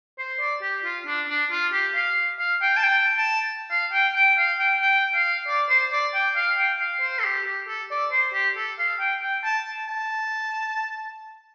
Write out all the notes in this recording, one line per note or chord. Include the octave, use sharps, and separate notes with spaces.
C5
D5
G4
F4
D4
D4
F4
G4
F5
F5
G5
A5
G5
A5
F5
G5
G5
F5
G5
G5
F5
D5
C5
D5
G5
F5
G5
F5
C5
A4
G4
G4
A4
D5
C5
G4
A4
F5
G5
G5
A5
A5